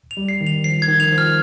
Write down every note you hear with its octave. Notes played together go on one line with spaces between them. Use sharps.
F7
G3
C7
D#3
F7
F3 C7
G#6
D#3
F7
F3
F6